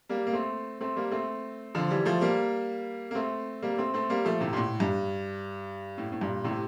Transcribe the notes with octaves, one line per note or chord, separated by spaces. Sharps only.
G3 A#3
A#3
A3 C4
A3 C4
G3 A#3
A3 C4
D3 F3
E3 G3
F3 A3
G3 A#3
A#3
A3 C4
G3 A#3
A3 C4
A3 C4
G3 A#3
F3 A3
A2 C3
A#2
A2
G2
A2
A2
G2 A#2
A2 C3